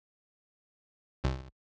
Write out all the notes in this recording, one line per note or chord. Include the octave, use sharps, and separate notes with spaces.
C2